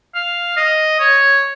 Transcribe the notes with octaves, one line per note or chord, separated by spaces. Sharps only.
F5
D#5
C#5